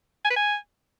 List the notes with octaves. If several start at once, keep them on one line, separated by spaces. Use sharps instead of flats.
G#5
B4
G#5